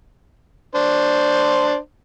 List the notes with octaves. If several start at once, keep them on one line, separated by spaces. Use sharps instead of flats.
D4 C5